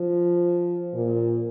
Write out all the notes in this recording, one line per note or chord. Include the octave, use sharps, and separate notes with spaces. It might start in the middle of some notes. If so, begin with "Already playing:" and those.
Already playing: F3
A#2